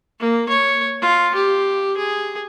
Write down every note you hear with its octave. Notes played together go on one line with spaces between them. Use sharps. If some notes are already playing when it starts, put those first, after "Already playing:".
A#3
C#5
F4
G4
G#4